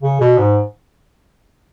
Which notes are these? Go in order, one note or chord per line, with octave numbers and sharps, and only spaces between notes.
C#3
B2
G#2